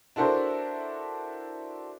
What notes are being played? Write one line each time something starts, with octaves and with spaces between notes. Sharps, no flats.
D4 E4 F#4 A4 A#4 C5